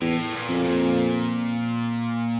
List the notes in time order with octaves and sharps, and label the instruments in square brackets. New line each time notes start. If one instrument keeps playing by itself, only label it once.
[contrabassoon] E2 [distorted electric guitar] A2
[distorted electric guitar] A#2
[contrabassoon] F2
[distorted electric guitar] A#2